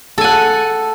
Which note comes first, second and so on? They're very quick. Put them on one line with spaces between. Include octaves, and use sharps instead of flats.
A4 G#5 F#5